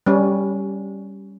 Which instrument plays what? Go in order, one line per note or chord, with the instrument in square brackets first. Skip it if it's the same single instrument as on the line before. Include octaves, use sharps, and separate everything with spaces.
[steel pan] G3 C#4